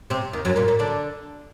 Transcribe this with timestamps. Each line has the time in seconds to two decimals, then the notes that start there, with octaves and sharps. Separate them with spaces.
0.10 C3 C4
0.33 D#2 D#3
0.45 F#2 F#3
0.56 A#2 A#3
0.68 A#2 A#3
0.79 D3 D4